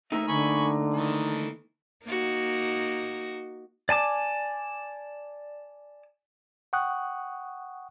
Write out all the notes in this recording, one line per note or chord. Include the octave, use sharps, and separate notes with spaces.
A3 A#3 D#4 E5
D3 G#5 B5 C#6
D#3 E3 A4
A#3 D#4 F#4
D5 G#5 A5 D6
F#5 G5 C#6 D#6 F#6